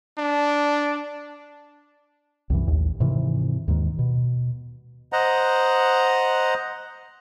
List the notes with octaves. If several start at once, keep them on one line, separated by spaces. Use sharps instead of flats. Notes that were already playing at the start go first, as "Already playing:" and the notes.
D4
C2 F#2 E3
A1 D#2
G#2 C3 D#3 E3
D#2 G#2 D#3
B2
C5 D#5 F#5 A#5